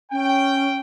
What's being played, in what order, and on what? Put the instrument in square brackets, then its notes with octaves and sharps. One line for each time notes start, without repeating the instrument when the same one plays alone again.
[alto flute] C#4 [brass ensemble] G5